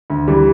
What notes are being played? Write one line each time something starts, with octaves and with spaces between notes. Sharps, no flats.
D2
E3 G3